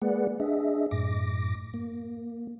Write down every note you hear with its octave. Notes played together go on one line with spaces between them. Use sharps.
G#3 A#3 G#4 B4 D5 F#5
D4 G#4 D#5 E5
F#2 A2 D6 A#6
A#3